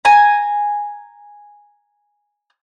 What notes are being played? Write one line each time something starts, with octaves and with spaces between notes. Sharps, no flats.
G#5 A#5